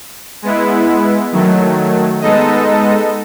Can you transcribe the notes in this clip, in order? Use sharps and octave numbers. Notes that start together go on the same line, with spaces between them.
G#3 B3 E4
D#3 F#3 A3
G#3 B3 D#4 A4 D#5